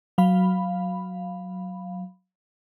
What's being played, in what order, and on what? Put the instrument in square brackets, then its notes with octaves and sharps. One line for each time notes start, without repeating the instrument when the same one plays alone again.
[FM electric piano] F#3 F5 B5